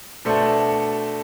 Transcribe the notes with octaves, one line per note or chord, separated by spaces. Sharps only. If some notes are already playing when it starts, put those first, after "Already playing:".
B2 A3 D4 A4 C5